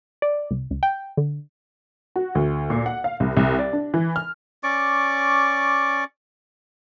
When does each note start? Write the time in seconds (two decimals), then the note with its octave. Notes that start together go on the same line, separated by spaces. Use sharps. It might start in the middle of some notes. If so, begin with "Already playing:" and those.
0.22 D5
0.51 C2
0.71 C#2
0.83 G5
1.17 D3
2.16 F#4
2.35 D2
2.70 A#2
2.86 F#5
3.04 F5
3.20 C2
3.37 C2
3.59 D5
3.73 D4
3.94 E3
4.16 F6
4.63 C#4 D5 C#6 D6